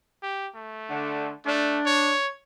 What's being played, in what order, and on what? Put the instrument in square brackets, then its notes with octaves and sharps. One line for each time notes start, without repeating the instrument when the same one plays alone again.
[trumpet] G4
A3
[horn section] D3
[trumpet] A3 [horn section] D4
[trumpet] C#5